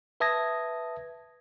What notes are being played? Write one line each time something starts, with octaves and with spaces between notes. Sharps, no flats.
B4 E5 A5 D#6 G#6 A#6